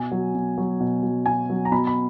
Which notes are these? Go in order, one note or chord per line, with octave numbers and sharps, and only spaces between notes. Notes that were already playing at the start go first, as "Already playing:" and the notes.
Already playing: B2 G#5
F#3
B2
F#3
B2
F#3
B2 G#5
F#3
A#5
B2 B5
B5